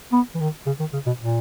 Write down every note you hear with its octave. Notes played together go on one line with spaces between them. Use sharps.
B3
E3
D#3
C#3
D#3
C#3
B2
A#2